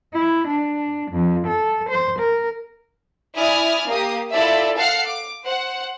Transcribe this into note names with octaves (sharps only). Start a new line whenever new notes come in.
E4
D4
F2
A4
C5
A#4
E4 D5 G#5 D#6 F6
A#3 G4 D#6
E4 F4 A4 D5 E5
A4 F5 F#5 F6 C7
D6
C5 F#5